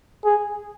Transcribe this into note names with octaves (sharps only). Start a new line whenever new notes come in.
G#4